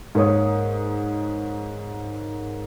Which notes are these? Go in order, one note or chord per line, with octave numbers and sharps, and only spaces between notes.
G#2 A#3 A#4 C#5 D#6